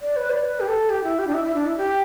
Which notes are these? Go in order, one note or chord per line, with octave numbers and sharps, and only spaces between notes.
D5
B4
D5
B4
G4
A4
G4
E4
G4
D4
E4
E4
D4
E4
G4